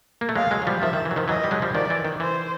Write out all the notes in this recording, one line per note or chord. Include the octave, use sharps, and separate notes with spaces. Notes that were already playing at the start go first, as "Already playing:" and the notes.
A#3
A3
F#3 G#3 F5
F#3 G#3
F#3
F3 G3
D#3 F3 E5
D#3
E3
F#3
D#3 F3
E3 F#3 D#5
G3
F#3 G#3
F3 G3
D#3 F3 D5
E3
D#3
E3 C5